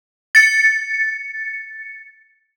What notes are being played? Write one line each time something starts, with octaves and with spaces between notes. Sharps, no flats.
A6 C#7